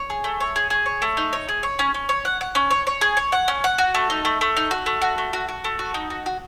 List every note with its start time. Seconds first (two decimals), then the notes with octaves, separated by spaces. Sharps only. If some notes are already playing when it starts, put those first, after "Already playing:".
Already playing: C#5
0.10 G#4
0.24 A3
0.40 C#5
0.56 G#4
0.70 G#4
0.86 C#5
1.02 A3
1.17 D#4
1.33 C#5
1.49 G#4
1.63 C#5
1.79 C#4
1.94 C#4
2.09 C#5
2.25 F#5
2.41 F#5
2.55 C#4
2.71 C#5
2.87 C#5
3.01 G#4
3.17 C#5
3.32 F#5
3.48 C#4
3.64 F#5
3.78 F#4
3.95 A3
4.10 D#4
4.25 A3
4.41 A3
4.57 D#4
4.71 F#4
4.86 A3
5.02 F#4
5.18 A3
5.33 F#4
5.48 F#4
5.64 A3
5.79 F#4
5.94 D#4
6.10 F#4
6.26 F#4